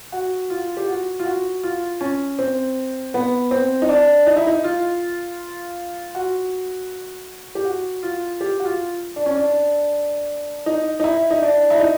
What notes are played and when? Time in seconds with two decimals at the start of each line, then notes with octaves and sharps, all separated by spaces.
0.12 F#4
0.50 F4
0.77 G4
0.88 F#4
1.19 F4
1.25 F#4
1.63 F4
2.01 C#4
2.39 C4
3.14 B3
3.51 C4
3.82 D#4
3.89 D4
4.27 D#4
4.37 E4
4.47 D#4
4.64 F4
6.15 F#4
7.55 G4
7.65 F#4
8.03 F4
8.41 G4
8.60 F#4
8.65 F4
9.16 D4
9.26 C#4
9.36 D4
10.66 D#4
11.00 D#4
11.04 E4
11.31 D#4
11.42 D4
11.70 E4
11.79 D#4